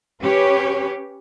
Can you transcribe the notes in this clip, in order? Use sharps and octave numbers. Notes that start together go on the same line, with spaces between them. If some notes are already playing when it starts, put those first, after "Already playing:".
C#4 G4 B4 C#5